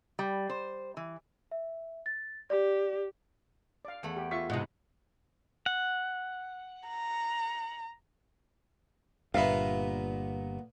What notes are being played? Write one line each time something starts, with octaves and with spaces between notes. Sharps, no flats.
G3
C5
E3
E5
A6
G4 D5
D5 F5
E2 A3 B5
G4
F4 E5 C#6 B6
G#2 C3 E4 D#5 F#5
F#5
A#5
G1 G2 A#2 B3 E5 F5